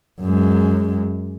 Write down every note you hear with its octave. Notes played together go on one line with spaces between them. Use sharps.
F#2 G#3